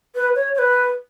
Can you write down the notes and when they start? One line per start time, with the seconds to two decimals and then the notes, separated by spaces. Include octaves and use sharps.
0.16 B4
0.35 C#5
0.55 C#5
0.59 B4